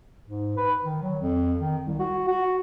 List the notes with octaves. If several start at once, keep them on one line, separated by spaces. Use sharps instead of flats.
G#2
B4
D#3
F#3
F2
D#3
C2
F#4
F#4